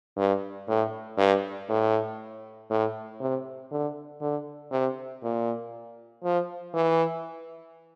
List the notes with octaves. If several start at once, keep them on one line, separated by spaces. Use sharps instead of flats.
G2
A2
G2
A2
A2
C3
D3
D3
C3
A#2
F3
E3